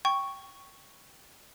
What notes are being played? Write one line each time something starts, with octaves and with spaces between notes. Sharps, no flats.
G5 C#6